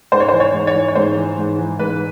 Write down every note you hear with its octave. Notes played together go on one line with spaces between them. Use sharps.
G#2 C5
C#5
C5
E3
C#5
G#2
C#5
E3
C#5
G#2 C5
E3
G#2
E3
G#2 B4